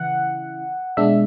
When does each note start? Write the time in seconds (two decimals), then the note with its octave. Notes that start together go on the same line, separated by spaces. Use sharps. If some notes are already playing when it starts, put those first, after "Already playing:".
Already playing: C#3 E3 E4 F#5
0.97 B2 G#3 D4 E5